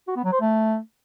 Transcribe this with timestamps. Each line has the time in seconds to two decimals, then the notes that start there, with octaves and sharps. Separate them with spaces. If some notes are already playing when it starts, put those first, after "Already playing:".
0.08 F#4
0.16 B3
0.24 F#3
0.32 C5
0.41 A3